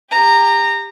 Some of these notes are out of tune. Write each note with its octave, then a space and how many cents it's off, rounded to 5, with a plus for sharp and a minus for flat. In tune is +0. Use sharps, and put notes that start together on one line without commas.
G4 +30 A#5 -15